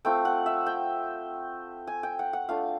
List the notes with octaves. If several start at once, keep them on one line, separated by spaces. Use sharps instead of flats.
A3 C4 F4 G5
F#5
E5
G5
G#5
G5
F#5
F#5
A3 D4 F4 F5